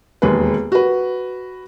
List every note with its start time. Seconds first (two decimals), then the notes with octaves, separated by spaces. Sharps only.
0.22 E1 D#2 G#4 B4
0.72 F#4 B4